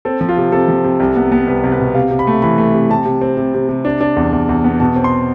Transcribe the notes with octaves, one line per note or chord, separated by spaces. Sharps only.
C4 A4
F3
F4
C3
C3 A4
F3
C3
C2
B3
B3
C2 B4
C2
B4
B2
C3 F5
C3
B5
A3
E3 B5
A3
C3
C3 A5
C3
C4
C3
C3
C3
D4
D4
E2
E2
E2
B3
B2 A5
C4
C6